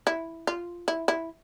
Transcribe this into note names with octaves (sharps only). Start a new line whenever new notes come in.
E4
F4
E4
E4